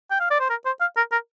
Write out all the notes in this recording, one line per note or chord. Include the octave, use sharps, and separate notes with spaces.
G5
F5
D5
C5
A#4
C5
F5
A#4
A#4